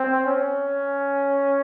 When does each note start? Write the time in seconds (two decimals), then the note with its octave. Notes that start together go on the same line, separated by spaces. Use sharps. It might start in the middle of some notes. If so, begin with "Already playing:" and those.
Already playing: C4
0.26 C#4